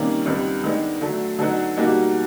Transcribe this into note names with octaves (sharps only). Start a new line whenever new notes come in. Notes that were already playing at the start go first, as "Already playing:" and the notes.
Already playing: C3 D#3 G3 A#3 C#4
C#2 C3 D#3 G3 B3
D#3 G#3 B3 D4
D3 F#3 A3
D3 F#3 B3 D#4 F#4
B2 G3 A#3 D#4 F#4